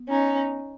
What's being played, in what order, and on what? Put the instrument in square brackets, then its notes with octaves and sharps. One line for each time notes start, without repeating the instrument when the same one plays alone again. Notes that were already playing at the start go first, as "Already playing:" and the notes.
Already playing: [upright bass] B3
[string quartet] C#4 D#4